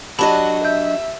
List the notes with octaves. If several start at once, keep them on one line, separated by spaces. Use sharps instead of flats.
F#3 D4 F#4 G4 D#5 A5 B5
E5 G6